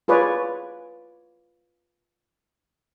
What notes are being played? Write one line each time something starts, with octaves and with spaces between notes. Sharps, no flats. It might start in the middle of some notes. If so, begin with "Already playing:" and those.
F4 G#4 B4 C#5 D5